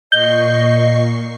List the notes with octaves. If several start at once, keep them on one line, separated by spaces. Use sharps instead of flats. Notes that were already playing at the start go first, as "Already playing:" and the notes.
A#2 D#5 C#6 G6 C7